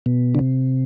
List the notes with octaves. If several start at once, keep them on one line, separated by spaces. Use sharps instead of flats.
B2
D3
C3